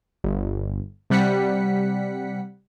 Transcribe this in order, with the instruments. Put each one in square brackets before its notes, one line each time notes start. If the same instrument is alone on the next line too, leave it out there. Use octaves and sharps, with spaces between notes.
[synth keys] G1
C3 G3 F#5 B6 C#7